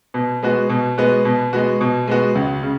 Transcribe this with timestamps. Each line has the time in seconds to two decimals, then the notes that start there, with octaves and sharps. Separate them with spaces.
0.14 B2
0.43 G#3 B3 F#4
0.69 B2
0.98 G#3 B3 F#4
1.25 B2
1.53 G#3 B3 F#4
1.81 B2
2.07 G#3 B3 F#4
2.35 C#2
2.63 C#3